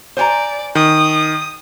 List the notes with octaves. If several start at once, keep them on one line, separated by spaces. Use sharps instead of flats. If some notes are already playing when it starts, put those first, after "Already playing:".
C5 D5 G#5 A#5
D#3 D#6